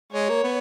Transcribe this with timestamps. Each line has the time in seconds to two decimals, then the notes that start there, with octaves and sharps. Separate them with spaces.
0.12 G#3 C#5
0.29 A#3
0.44 B3